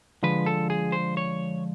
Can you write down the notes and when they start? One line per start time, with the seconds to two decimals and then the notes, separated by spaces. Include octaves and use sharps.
0.23 D3 F3 G#3 B4
0.46 A4
0.70 G#4
0.92 C5
1.17 C#5